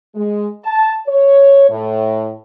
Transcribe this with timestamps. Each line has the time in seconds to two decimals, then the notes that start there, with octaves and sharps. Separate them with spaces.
0.15 G#3
0.65 A5
1.08 C#5
1.70 A2